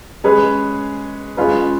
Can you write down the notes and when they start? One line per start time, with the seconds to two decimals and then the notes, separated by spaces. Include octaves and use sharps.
0.24 G#3 C#4 G#4 B4
1.37 G#3 C#4 F4 B4